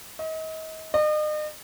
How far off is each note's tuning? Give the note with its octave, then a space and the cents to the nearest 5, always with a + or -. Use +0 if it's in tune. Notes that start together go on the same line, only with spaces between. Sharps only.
D#5 +35
D#5 -40